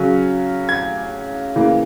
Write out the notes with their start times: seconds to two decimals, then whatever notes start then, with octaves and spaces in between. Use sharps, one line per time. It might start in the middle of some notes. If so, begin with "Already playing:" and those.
Already playing: C#3 F#3 C#4
0.69 G#6
1.56 C#3 E3 A#3